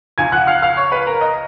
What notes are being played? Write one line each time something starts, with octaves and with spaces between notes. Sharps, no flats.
C#2 C#3 F3 G#5 G#6
F#5 F#6
F5 F6
F5 F6
C#5 C#6
B4 B5
A#4 A#5
D#5